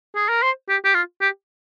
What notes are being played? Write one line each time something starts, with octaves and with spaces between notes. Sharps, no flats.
G#4
A#4
C5
G4
G4
F4
G4